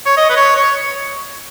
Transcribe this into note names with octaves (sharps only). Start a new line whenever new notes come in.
C#5
D#5
B4
C#5
C#5